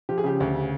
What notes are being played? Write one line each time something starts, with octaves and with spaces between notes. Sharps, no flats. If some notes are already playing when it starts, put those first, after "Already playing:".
F3 G4
G#4
C#3 G4
D2
C#3